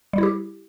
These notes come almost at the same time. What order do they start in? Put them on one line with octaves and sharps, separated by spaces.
G3 E4 G4